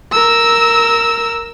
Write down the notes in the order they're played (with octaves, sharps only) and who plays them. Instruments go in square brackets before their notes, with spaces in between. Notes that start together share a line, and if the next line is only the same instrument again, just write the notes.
[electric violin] A#4 E6